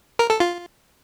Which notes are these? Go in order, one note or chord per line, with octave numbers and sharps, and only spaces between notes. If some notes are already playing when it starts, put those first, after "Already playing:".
A#4
A4
F4